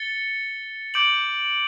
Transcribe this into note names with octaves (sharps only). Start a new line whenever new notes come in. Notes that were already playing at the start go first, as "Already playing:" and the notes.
Already playing: A6 C#7 G7
D6 G6 D7 F#7